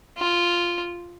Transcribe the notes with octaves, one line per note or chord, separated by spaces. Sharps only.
F4